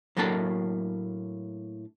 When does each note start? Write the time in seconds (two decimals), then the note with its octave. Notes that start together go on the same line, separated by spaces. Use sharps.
0.17 A2 F#3 A3 A#3 D4 A5